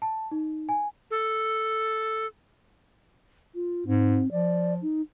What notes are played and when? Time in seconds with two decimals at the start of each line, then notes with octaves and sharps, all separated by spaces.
0.02 A5
0.31 D#4
0.69 G#5
1.11 A4
3.55 F4
3.87 G#2 C4
4.31 F3 D5
4.82 D#4